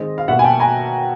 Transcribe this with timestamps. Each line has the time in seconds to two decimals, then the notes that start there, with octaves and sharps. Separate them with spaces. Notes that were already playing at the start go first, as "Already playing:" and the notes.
Already playing: D#3 G#3 C4 D#5
0.18 F5
0.28 B2 G3 A#3 E5 F#5
0.39 G#5
0.44 G5 A5
0.60 G#5 A#5